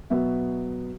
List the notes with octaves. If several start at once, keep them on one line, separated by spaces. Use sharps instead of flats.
B2 F#3 B3 E5